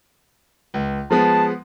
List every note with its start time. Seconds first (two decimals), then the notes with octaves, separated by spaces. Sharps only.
0.74 C#2
1.10 F3 G#3 B3 A5